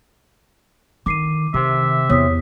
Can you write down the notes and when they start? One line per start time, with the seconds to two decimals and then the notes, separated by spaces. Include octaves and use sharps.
1.06 D3 D#3 D6 C7 D#7
1.54 C3 D#3 E5 D6
2.10 E2 C#5 D#6 B6